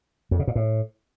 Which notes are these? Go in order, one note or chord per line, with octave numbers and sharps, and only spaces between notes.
F2
C#3
A#2
A2